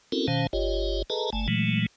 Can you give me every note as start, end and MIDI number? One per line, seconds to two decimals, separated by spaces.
0.12 0.27 60
0.12 0.27 61
0.12 0.27 64
0.12 0.27 66
0.12 0.27 69
0.12 0.27 70
0.28 0.47 47
0.28 0.47 51
0.28 0.47 61
0.28 0.47 72
0.28 0.47 77
0.28 0.47 81
0.53 1.02 31
0.53 1.02 65
0.53 1.02 67
0.53 1.02 73
0.53 1.02 75
1.10 1.30 68
1.10 1.30 69
1.10 1.30 71
1.10 1.30 75
1.10 1.30 81
1.10 1.30 82
1.33 1.48 31
1.33 1.48 57
1.33 1.48 80
1.33 1.48 81
1.48 1.86 46
1.48 1.86 52
1.48 1.86 54
1.48 1.86 56
1.48 1.86 57